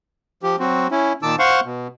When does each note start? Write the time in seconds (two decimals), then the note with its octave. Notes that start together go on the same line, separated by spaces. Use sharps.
0.43 F3 G4
0.60 F#3 C4 F#4
0.91 C#4 E4
1.23 A#2 D#3 A5 D6 E6
1.39 C5 F5 F#5 C6 C#6
1.65 B2